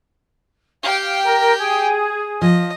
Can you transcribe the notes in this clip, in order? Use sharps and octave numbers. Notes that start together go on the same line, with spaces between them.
G4 F5 G5
A#4
G#4
F3 D#5